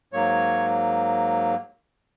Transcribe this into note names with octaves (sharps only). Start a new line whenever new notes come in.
G#2 F#3 A#3 C#5